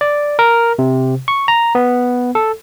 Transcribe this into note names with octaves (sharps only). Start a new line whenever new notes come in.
D5
A#4
C3
C#6
A#5
B3
A4